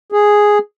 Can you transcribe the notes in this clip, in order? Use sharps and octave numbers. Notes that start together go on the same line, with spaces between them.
G#4